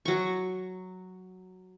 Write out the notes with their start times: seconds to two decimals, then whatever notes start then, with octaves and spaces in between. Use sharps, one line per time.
0.05 F#3 C#6